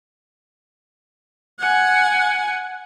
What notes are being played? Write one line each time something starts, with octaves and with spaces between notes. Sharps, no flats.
F#5 G#5